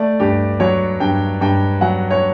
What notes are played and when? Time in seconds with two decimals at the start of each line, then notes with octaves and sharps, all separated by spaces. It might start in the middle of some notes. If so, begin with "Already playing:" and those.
Already playing: A3 D5
0.20 G2 G4
0.60 F#3 C#5
1.00 G2 G5
1.41 G2 G5
1.81 F#3 F#5
2.10 C#5